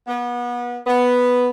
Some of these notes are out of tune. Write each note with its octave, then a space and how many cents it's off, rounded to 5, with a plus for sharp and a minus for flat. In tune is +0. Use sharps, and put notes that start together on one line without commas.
B3 -30
B3 +0